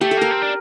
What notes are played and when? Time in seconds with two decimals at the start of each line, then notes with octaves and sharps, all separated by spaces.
0.01 A3 G4
0.11 A4
0.17 A#3 A#4
0.31 C4
0.42 D4